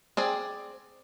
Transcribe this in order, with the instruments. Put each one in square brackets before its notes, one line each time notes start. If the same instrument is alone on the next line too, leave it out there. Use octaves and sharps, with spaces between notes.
[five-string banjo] C4 G#4 D5